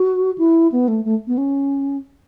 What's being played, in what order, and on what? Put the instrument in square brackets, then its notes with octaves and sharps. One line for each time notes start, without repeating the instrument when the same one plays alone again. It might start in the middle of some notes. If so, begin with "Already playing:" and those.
Already playing: [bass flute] F#4
E4
B3
A3
A3
B3
C#4